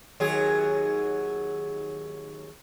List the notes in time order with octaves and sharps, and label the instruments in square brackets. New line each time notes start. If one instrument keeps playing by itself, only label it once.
[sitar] D#2 F#3 G#4